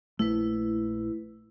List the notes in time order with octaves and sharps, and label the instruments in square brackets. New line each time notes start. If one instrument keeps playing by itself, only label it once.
[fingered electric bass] A#1 A3 [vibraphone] E4 B4